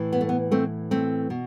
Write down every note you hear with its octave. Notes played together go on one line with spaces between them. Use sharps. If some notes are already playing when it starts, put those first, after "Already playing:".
Already playing: A2 E3
B3
A3
B3
A3 C4
A3 C4
B2